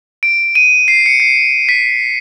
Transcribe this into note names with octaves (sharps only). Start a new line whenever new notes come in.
D7
D#7
C7
C#7
C7
B6